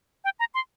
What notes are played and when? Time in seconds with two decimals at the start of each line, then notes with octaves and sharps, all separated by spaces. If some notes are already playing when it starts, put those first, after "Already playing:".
0.24 G5
0.40 A#5
0.54 C6